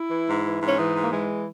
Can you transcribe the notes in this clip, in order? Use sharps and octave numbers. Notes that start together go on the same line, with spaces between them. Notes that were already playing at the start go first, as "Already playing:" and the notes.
Already playing: E4
E3
G#2
E3
G#2
C#4
E3 D#4
G#2
A#3
E3 G#3